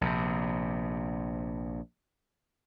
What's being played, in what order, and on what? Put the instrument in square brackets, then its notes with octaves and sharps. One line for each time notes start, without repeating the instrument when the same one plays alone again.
[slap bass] A#1 C3